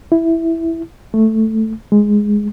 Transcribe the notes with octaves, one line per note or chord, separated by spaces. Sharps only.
E4
A3
G#3